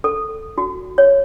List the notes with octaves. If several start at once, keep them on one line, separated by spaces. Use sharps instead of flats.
A4
F#4
C#5